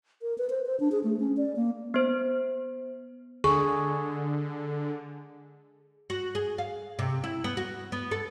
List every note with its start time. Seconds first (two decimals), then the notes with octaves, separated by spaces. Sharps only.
0.22 A#4
0.38 B4
0.50 C5
0.66 C5
0.80 D4
0.92 G#4
1.04 A3
1.20 C#4
1.37 D5
1.56 A#3
1.94 B3 C5
3.44 D3 G#4 C#6
6.10 F#4
6.35 G#4
6.58 F5
6.99 C3
7.24 E4
7.44 B3
7.57 F#4
7.92 B3
8.11 A4